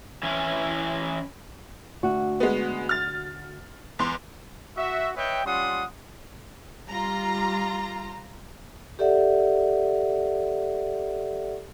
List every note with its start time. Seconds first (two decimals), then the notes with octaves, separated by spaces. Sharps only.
0.23 E3 C#4 E4
2.03 D2 F#4
2.40 G#3 B3
2.89 F6 A6
3.99 E2 C6
4.76 F#4 E5
5.16 B4 C#5 D#5 E5 G5
5.45 G3 C#4 F4 F#5 C6 D#6
6.89 G3 F4 A#5
8.99 G4 A4 D5 E5 F#5